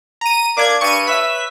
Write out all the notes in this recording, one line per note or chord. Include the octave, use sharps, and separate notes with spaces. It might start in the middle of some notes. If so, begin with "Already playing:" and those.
A#5 D#7
A#3 D4 D6 G#6
G2 C#6 D#7
B4 C#5 E5 B6